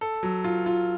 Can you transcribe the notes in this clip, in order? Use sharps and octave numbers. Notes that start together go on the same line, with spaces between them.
A4
F#3
F4
F4